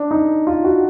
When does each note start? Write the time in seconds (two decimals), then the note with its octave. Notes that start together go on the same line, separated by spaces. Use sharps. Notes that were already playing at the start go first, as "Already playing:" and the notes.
Already playing: D4
0.11 D#4
0.47 F4
0.65 F#4